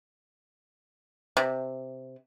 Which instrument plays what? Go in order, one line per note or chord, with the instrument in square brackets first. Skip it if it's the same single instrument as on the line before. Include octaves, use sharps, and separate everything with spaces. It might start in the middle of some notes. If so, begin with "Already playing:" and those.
[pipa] C3